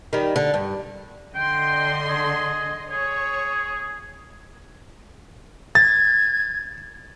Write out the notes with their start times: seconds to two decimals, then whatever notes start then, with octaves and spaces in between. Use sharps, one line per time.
0.13 D#3 G3
0.36 D3
0.54 G2
1.35 D3 D#5 G5 C6
2.09 G#4
2.91 G#4 C#5
5.75 G#6 A6